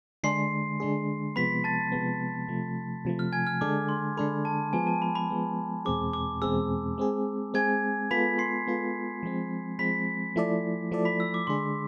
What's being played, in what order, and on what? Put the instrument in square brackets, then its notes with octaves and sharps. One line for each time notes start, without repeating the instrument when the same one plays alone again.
[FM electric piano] D3 G#3 D4 G#4 [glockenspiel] C6 C7
[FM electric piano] D3 G#3 D4 G#4
[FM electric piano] C3 F3 G#3 B3 [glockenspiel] B5 B6
[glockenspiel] A5 A6
[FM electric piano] C3 F3 G#3 B3
C3 F3 A3
C3 F3 A3
[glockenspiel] F6
G#5 G#6
F6
[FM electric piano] D3 G#3 D4 A4 [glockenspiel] D6
[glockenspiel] C6
[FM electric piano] D3 G#3 D4 A4 [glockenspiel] B5
[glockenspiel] A5
[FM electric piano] F3 G#3 B3 [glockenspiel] G#5
[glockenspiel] A5
B5
B5
[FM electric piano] F3 G#3 B3
[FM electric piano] E2 B2 G#3 C4 G#4 [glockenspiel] D6
[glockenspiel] D6
[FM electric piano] E2 B2 G#3 C4 G#4 [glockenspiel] E6
[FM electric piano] G#3 C4 G#4
[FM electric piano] G#3 C4 G#4 [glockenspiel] G#5 G#6
[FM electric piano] G#3 B3 F4 A4 [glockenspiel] B5 B6
[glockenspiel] C6 C7
[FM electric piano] G#3 B3 F4 A4
F3 G#3 C4
[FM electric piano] F3 G#3 C4 [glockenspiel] B5 B6
[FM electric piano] F3 A3 E4 A4 D5
F3 A3 E4 A4 D5
[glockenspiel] B5 B6
E6
D6
[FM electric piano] D3 G#3 D4 G#4 [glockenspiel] C6